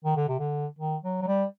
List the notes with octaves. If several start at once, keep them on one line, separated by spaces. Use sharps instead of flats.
D#3
D3
C3
D3
D#3
F#3
F#3
G3